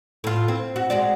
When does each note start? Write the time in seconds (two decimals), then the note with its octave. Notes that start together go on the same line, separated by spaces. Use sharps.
0.24 A2 F4
0.48 C4
0.76 F#4
0.90 G#3 F#4 D5